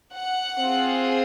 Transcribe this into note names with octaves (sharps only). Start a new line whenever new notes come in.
F#5
C4 F4 G#4